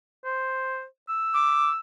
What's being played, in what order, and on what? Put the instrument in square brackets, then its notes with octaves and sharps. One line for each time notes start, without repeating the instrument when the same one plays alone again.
[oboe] C5
E6
[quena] D6